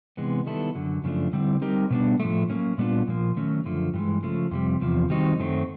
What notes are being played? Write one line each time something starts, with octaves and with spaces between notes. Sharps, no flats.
C3 E3 G#3 B3
D#3 G3 B3 E4 A4
F#2 D3 F#3
F#2 C#3 F3 A3 D4
D3 G3 C4 E4
G3 C4 D#4 G4 A#4
B2 G3 B3 D4
A2 F3 A3
F#3 A#3 C#4
A#2 G3 B3 D4 F4
A#2 F3 A#3
D#3 F#3 A3 C#4
F#2 D3 F3 A3
G2 E3 G#3
C#3 F3 A3
F2 C3 G3
E2 C3 F3
D#3 G3 C4 D#4 F#4
F#2 D#3 F#3 A3 C4